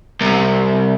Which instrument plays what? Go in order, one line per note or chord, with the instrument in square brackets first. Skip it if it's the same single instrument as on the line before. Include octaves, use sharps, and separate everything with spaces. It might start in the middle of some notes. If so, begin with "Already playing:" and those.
[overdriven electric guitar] C2 C3